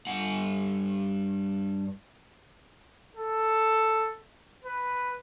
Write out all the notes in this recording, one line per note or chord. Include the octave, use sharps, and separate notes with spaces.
G2 F#5
A4
B4